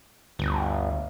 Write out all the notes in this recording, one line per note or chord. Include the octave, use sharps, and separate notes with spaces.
G1 D2